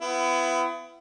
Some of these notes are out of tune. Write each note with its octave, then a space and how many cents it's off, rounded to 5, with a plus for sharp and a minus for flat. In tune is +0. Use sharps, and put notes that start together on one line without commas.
B3 +30 E4 +35